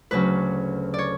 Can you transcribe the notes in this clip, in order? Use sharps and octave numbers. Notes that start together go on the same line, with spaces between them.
D2 C#3 F#3 B4
C#5 D5